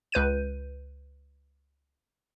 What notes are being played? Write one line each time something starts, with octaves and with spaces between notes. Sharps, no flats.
C#2 B4 G6 D#7